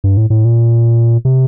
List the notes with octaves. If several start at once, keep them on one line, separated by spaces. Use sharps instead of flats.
G2
A2
A2
A#2
C3